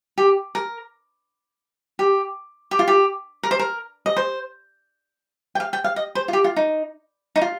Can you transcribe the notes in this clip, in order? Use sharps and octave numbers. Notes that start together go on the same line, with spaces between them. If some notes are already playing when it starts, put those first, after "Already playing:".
G4
A#4
G4
G4
F4
G4
A#4
C5
A#4
D#5
C5
G5
F5
G5
F5
D#5
C5
F4
G4
F4
D#4
D#4
F4